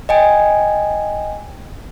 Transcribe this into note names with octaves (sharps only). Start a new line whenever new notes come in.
D#5 G5 G#5